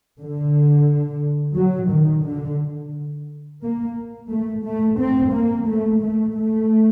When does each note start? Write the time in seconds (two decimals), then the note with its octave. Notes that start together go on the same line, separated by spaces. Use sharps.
0.19 D3
1.56 F#3
1.91 D#3
2.25 D3
3.62 A#3
4.31 A3
4.65 A3
4.99 C4
5.34 A#3
5.68 A3
6.02 A3
6.36 A3